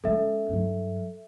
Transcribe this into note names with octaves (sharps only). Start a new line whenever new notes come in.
G#3 C#4 A4 E5
G2 F#3